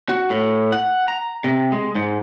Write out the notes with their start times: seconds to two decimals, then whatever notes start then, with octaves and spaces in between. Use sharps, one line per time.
0.09 F#4
0.30 A2
0.72 F#5
1.08 A#5
1.44 C3
1.72 G#3
1.95 G#2